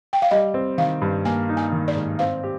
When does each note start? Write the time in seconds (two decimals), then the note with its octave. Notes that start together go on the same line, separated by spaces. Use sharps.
0.13 G5
0.22 F5
0.31 G3 D#5
0.54 C4
0.78 D#3 F5
1.02 G2
1.25 A#3 G#5
1.49 D#4
1.57 G#5
1.72 D#3
1.88 D5
1.95 G#2
2.19 C4 F5
2.43 G4